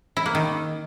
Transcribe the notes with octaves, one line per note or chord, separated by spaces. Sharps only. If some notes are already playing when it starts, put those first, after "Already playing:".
E4
A#3
D#3